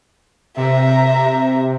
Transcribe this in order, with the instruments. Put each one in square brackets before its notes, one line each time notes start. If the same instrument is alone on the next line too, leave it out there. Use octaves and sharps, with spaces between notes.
[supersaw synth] C3 [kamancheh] E5 A#5